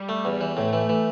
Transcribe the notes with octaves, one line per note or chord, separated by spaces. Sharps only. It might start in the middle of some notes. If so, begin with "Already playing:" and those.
Already playing: G3
A3
E2
E3
A2 A3
E3
E3